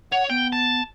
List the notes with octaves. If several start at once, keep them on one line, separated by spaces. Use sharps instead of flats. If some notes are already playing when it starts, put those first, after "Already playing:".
C#5 F#5
B3 G5
A5